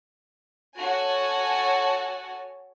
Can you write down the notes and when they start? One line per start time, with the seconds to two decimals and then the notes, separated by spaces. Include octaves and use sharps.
0.77 F#4 A4 C#5 G#5 A5